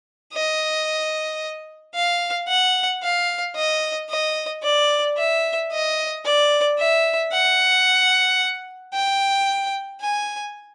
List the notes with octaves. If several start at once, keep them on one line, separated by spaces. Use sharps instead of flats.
D#5
F5
F#5
F5
D#5
D#5
D5
E5
D#5
D5
E5
F#5
G5
G#5